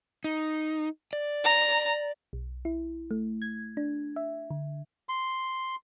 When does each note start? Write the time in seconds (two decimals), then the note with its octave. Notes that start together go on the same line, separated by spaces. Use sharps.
0.24 D#4
1.13 D5
1.44 A#5
2.33 B1
2.65 E4
3.11 A3
3.42 G#6
3.77 D4
4.16 E5
4.50 D3
5.09 C6